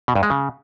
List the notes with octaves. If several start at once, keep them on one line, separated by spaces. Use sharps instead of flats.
B2
G2
G#3
C#3